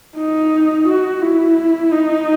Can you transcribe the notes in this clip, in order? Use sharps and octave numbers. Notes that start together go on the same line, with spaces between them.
D#4
F#4
E4
D#4